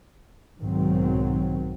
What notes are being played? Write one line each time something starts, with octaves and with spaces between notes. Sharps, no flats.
B1 G#2 D#3 F#3 C4